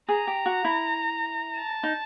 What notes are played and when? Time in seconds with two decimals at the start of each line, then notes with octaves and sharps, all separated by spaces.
0.09 G#4 A#5
0.27 G4
0.46 F#4
0.65 E4
1.56 A5
1.83 D#4